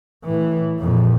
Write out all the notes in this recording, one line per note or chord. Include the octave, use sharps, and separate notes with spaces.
A2 E3
F2 A#2